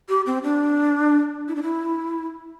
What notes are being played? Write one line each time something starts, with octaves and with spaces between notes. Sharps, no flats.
G4
C4
D4
E4
D4
E4